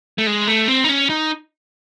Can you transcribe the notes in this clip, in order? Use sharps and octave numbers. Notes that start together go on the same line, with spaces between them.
A3
G#3
A3
C4
D#4
C#4
D#4